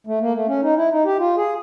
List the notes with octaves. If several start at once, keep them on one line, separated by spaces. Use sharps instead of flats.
A3
A#3
A3
C#4
D#4
E4
D#4
G4
F4
G#4